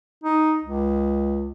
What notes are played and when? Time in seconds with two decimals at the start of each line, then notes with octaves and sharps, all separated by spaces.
0.23 D#4
0.64 C#2